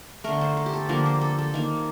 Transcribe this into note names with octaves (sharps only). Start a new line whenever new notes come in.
D3 A3 A#4
C5
C5
G4
A4
D3 F3 A#3 A#4
C5
A4
A4
D#3 A#3